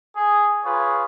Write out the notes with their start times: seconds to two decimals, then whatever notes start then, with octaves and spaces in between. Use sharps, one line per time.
0.16 G#4
0.64 F4 G#4 B4 C#5